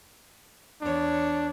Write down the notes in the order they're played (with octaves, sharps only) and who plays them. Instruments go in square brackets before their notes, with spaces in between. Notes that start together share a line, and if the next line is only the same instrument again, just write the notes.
[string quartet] E2 C#5 [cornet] D4